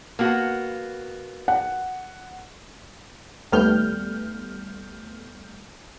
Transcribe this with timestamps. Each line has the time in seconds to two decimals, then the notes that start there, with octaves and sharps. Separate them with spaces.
0.19 A#3 B3 F#4
1.48 F#5
3.52 D#2 G3 A3 B3 F6 G6